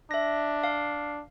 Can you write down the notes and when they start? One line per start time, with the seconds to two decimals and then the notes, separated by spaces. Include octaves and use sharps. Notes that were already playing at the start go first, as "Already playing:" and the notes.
0.11 D4 E5 A#6
0.64 F5